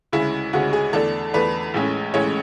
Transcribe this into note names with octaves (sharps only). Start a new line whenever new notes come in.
D2 C#3 G#3 C#4 E4
D2 C#3 G#3 C#4 F#4
G#4
E2 D3 A3 D4 A4
E2 D3 A3 D4 B4
A1 A2 G#3 C#4
A1 A2 G#3 C#4 C#5